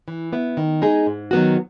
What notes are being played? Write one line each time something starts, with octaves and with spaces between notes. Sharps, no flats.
E3
B3 E4
D#3
G#3 D#4 G#4
G#2
D#3 F#3 B3 F#4